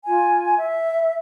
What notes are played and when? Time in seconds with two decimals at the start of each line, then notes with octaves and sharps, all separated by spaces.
0.05 F4 G#5
0.58 E5